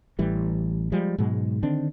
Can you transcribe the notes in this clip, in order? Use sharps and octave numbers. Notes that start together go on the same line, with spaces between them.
A1 E3 G3
F3 G3 G#3
G#2 B2 F#3 G#3
D3 D#3 C4 D4